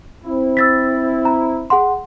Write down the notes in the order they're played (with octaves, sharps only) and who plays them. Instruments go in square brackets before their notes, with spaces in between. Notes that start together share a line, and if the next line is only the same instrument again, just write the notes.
[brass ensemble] C4 E4
[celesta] E6 A6 B6
A#5
G#4 F#5 C6